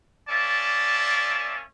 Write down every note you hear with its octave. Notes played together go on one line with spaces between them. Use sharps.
A#3 C#4 D5 E5 A5